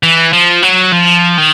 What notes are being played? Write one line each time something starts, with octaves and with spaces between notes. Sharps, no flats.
E3
F3
F#3
F3
D#3